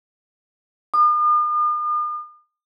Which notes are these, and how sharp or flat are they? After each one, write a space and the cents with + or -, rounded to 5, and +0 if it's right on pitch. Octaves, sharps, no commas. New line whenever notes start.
D#6 -45